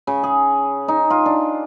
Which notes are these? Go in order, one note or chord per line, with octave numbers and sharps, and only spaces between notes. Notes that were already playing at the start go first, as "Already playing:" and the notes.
C#3
G#4
D#4
F4
D4